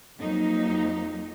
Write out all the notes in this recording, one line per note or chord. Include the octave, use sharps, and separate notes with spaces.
F2 F#3 A#3 D#4